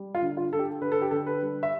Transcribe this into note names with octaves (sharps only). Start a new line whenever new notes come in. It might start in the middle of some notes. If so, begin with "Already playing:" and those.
Already playing: G3
F4
D3
F4
D3 A4
G4
D3 B4
A4
G4
D3 A4
B4
G3
E5